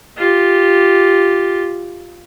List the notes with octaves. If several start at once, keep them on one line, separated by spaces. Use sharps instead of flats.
F4 G4